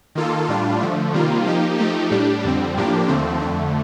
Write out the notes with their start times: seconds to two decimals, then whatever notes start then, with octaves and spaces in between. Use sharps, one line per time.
0.15 D#3 A#3 F4 A4
0.48 A2 G3 D4 F4
0.80 D3 F3 A3
1.14 C3 D#3 G3 A#3 F4
1.46 F3 A#3 D#4 G4
1.78 F3 A3 D#4 G4
2.11 A2 G3 D4 G4
2.44 F2 D3 G3 C4
2.77 A2 F3 A#3 D4 G4
3.08 D#2 D3 F3 A3 C4
3.42 F2 D3 A3